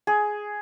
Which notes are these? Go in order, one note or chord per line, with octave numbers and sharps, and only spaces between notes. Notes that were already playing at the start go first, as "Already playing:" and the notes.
G#4